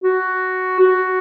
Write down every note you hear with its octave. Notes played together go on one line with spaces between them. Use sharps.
F#4
F#4